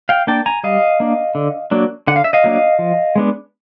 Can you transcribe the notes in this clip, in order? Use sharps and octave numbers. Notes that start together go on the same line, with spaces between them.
F5 G5
A#3 D4 G5 A5
G#5 A#5
G3 D#5 F5
A#3 D4
D3
F#3 A#3 D4
D3 F#5
F5
E5
D#5 F5
F#3 A#3 D4
F3
G#3 B3 D4